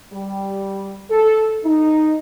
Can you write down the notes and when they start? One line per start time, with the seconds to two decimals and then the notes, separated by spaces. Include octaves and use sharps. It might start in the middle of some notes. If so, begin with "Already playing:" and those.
0.13 G3
1.10 A4
1.64 D#4